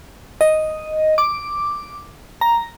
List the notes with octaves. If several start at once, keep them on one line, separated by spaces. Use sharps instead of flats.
D#5
D6
A#5